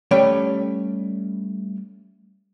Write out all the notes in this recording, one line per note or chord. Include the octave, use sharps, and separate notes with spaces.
G3 A3 C#4 C#5 G5